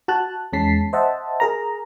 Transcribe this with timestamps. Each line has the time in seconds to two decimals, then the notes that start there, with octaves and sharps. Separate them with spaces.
0.08 F#4 A5 F#6
0.53 E2 G#3 C#4 A5 B6 C7
0.93 C5 D#5 E5 F#5 A5
1.40 G#4 A#4 A#5